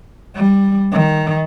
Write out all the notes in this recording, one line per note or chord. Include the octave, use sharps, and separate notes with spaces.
G3
D#3